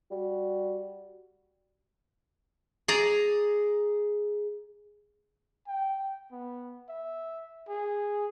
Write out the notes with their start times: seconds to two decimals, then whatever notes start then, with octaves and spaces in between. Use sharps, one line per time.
0.11 G3 F#4
2.88 G#4 D5 A#5
5.67 G5
6.32 B3
6.89 E5
7.69 G#4